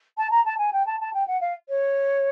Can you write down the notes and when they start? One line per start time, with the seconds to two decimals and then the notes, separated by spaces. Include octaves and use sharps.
0.17 A5
0.31 A#5
0.45 A5
0.58 G#5
0.73 G5
0.86 A5
1.00 A5
1.14 G5
1.27 F#5
1.41 F5
1.69 C#5